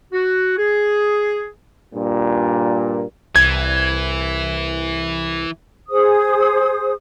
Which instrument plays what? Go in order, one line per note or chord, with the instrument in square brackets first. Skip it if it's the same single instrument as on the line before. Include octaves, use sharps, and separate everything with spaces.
[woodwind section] F#4
G#4
[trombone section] G2 A#2
[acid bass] C2 [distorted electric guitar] E3 [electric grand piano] G#6
[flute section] G#4 C5 D#6